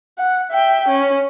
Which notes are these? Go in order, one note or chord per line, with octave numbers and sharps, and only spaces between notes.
F#5
E5 G5
C#4